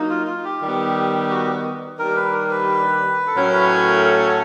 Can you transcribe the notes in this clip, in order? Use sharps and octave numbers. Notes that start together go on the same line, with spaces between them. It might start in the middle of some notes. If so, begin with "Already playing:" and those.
Already playing: F#3 A#3 D#4
F4
F4
G4
D#3 G3 B3
F#4
D#3 G3 A#3 D4 G4 A#4
B4
A#4
B4
A4
A2 F#3 A3 C#4 A#4
B4
B4
A#4
A4